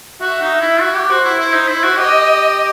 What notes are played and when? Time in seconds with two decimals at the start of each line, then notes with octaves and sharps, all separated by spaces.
0.21 F#4 E5
0.42 D#4
0.60 E4
0.81 F#4
0.95 G4
1.10 F#4 C5
1.24 E4
1.39 E4 C5
1.53 D#4
1.68 E4
1.84 F#4
1.98 G4 D#5